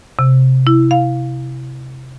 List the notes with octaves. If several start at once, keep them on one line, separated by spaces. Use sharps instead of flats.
C3
E4
F5